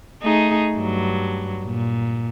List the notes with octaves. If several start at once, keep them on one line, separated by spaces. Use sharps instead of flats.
A3 D#4 G#4
G2 F#3
A#2